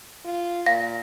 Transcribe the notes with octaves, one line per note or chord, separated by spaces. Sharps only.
F4
A#2 F5 A#6